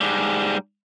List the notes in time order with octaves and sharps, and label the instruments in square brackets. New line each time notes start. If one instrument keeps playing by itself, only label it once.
[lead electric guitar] G#2 G3